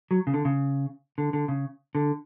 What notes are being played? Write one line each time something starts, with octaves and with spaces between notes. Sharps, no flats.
F#3
C#3
D3
C#3
D3
D3
C#3
D3